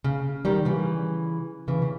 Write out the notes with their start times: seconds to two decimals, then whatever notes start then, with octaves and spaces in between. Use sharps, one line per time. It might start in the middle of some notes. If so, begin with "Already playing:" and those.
0.04 C#3
0.45 D#3 G3
0.65 C#3 E3
1.68 C#3 E3
1.82 C#3